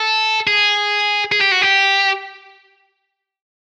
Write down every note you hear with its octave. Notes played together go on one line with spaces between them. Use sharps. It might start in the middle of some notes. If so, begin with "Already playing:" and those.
Already playing: A4
G#4
G#4
G4
F#4
G4